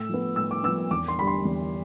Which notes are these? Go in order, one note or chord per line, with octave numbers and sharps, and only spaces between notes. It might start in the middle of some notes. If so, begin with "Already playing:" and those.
Already playing: A2 E6
F3 B3
A2 E6
D6
F3 B3 E6
E2 D6
C6
D3 G3 B5
C6
E2